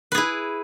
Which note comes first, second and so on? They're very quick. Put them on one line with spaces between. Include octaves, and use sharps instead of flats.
B4 G#4 E4